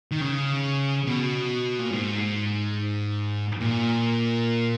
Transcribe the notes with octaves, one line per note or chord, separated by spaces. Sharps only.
D#3
C#3
B2
A#2
G#2
A#2